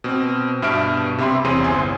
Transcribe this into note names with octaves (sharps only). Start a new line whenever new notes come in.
B2 C4
G2 B2 E5 A5 F6 D7
C3 C4 G4 E5 B5 C6
E2 C4 C#4 G#4 C6 D#7
G1 C2 G#5 C6